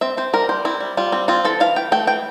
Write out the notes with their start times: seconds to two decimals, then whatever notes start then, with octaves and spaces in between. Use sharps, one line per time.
0.01 C4 E5
0.17 C4 C5
0.33 G3 A#4
0.49 G3 C5
0.65 C4 E4
0.81 G3
0.97 G3 F4
1.12 C4
1.28 C4 F4
1.45 E3 A4
1.60 E3 F5
1.76 E3 G5
1.92 A3 G5
2.07 E3 G5